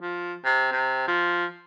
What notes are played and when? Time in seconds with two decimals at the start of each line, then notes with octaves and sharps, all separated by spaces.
0.01 F3
0.45 C3
0.72 C3
1.08 F3